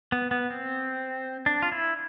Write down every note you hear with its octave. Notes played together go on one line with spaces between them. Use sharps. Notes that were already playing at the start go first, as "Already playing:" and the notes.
B3
B3
C4
D4
F4
E4